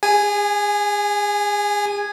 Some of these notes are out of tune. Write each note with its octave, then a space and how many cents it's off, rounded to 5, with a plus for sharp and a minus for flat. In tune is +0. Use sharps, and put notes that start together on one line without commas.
G#4 -35 G#5 +0